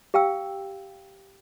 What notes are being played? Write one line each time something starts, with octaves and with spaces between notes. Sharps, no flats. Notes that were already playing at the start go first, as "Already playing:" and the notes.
G4 F5 G5 E6